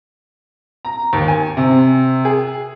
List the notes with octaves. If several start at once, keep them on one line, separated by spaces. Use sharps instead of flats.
A#5
D#2
G#5
C3
G#4